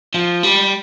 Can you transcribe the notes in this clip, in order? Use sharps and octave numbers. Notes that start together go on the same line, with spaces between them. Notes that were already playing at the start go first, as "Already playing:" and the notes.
F3
G3